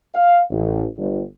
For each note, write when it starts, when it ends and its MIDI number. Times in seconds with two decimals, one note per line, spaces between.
0.15 0.40 77
0.50 0.84 33
0.98 1.22 31